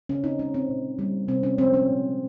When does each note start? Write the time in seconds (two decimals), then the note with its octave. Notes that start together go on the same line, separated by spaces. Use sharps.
0.09 C#3 C#4
0.24 C4 D#4
0.39 G#3 C#4
0.54 C4
0.69 A#2
0.99 G3 A#3
1.28 C3 C4
1.43 C#4
1.58 F3 G#3 C4
1.74 C#4
1.88 A#2